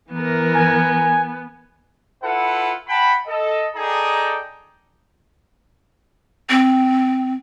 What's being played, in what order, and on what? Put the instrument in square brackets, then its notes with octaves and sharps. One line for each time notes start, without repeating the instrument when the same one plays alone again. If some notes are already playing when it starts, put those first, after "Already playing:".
[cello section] E3 A#4 [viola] B3
[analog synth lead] G#5
[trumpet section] E4 F4 A4 B4 F#5
F#5 G5 A5 B5
A4 D#5
D#4 G#4 A4 D5 G5 A#5
[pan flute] C4